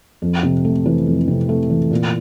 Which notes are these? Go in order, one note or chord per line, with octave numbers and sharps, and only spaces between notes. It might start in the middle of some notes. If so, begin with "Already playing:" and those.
F2
C3
A3
E3
F2
C3
A3
E3
A#2